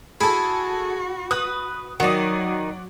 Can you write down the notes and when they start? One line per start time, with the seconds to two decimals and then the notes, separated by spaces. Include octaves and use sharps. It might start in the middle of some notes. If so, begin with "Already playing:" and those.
0.21 E4 F#4 G#4 A4 B5
1.31 B4 D#6 F#6
2.00 D#3 F#3 D#4 F#4 D5